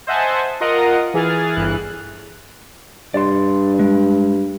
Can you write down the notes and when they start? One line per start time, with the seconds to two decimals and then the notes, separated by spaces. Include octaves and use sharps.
0.07 C5 D#5 E5 F#5 G#5 A5
0.60 F4 A#4 D#5 F#5 A#5 D#6
1.14 E3 G#4 F6 A6
1.56 G1 E3 F#6
3.14 G2 D5 C6
3.79 G#3